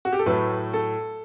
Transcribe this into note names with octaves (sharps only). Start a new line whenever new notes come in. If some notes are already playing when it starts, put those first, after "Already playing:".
F#4
G4
A4
A2 F#3 A3 B4
A4